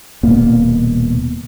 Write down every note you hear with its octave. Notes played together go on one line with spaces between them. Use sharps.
D#1 B2 A#3 B3